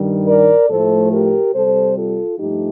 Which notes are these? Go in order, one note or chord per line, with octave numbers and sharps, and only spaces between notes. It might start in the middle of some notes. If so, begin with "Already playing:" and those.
Already playing: G2 D#3 G3
A#4 D5
A2 F3 A3 A4 C5
G4 A#4
C3 G3 A4 C5
F4 A4
G2 F3 A3 D#4 G4